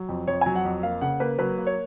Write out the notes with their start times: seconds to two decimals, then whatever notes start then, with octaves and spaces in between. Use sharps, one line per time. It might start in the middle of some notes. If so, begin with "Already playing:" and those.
Already playing: F#3
0.09 F2
0.27 F2 C#5
0.41 F#3 G#5
0.56 F#5
0.65 F2
0.83 A#3 F5
1.01 C#3 F#5
1.20 A#3 B4
1.38 F#3 B4
1.58 A#3
1.67 C#5